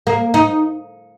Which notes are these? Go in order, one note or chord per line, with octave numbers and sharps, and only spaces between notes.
A#3
D#4